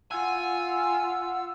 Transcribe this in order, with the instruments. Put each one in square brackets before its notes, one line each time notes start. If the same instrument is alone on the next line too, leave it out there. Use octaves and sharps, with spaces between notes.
[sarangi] F4 [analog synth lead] F#5 [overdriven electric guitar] G#5 [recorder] E6